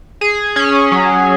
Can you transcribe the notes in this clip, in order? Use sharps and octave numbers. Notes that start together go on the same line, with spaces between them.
G#4
C#4
F#3